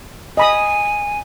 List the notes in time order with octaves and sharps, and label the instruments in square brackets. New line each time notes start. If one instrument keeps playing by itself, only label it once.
[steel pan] D#5 B5 D#6 [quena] G#5